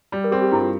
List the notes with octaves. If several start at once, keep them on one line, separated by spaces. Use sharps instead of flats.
G3
A#4
C4 G#4
G4
G2 E4
F4